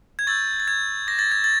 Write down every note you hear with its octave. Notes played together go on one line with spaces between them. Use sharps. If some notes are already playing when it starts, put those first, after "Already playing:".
G#6
C#6 E6 G6 A6
A6
G#6
D6 G6 A#6
A6
G#6
A6